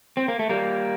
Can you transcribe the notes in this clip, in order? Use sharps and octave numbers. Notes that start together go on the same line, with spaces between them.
C4
A#3
A3
G3 A#3